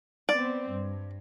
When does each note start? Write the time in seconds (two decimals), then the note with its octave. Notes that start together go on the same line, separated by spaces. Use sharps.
0.29 B3 C4 D5
0.70 G2